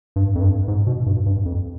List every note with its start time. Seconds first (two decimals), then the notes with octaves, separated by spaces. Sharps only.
0.16 G2
0.35 F2
0.41 G2
0.68 G#2
0.87 B2
1.06 G2
1.26 G2
1.45 F2